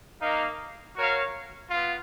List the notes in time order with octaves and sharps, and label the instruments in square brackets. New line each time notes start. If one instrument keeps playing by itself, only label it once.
[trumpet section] A#3 D#4 A#4 F5
F#4 A#4 C#5 F5
B3 F4